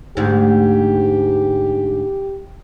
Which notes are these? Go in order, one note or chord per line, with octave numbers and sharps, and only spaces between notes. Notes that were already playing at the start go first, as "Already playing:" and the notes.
D2 G#2 G4